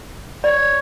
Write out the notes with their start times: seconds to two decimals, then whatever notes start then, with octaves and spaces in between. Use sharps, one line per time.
0.44 C#5 D5